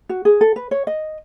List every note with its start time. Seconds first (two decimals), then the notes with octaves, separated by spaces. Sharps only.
0.09 F#4
0.25 G#4
0.41 A4
0.56 B4
0.71 C#5
0.87 D#5